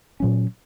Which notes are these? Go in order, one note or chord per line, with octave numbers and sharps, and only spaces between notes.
A#2 F#3 C#4